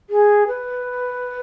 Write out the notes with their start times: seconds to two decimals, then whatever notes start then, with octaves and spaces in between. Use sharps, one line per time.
0.10 G#4
0.48 B4